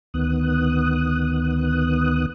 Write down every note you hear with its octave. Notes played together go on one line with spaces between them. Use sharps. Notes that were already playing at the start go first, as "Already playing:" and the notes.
D2 D#3 B3 D#6 F#6